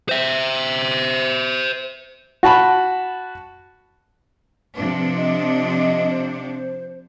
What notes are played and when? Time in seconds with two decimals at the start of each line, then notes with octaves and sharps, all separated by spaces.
0.09 C5 E5
2.43 F#4 A5 B5
4.75 C3 F3 D4 B4
5.16 D#5
6.10 C5